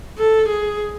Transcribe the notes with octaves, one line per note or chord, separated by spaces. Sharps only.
A4
G#4